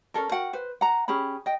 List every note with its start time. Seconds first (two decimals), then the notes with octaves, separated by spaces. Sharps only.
0.14 C#4 D4 A4 A#4
0.31 F#4 A#4 F#5 G5
0.53 B4 C5
0.81 F#5 A#5
1.08 C#4 G4 G#4 B5
1.46 D#5 G5